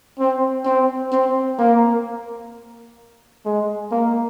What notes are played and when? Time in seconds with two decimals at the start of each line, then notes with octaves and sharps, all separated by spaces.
0.20 C4
0.65 C4
1.12 C4
1.59 A#3
3.45 G#3
3.91 A#3